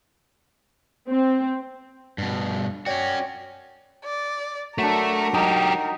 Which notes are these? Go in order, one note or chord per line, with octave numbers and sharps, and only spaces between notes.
C4
G2 B2
C#4 F#4 C#5 D5 G5
D5
F#3 A3 D4 A#4
F#3 D#4 G4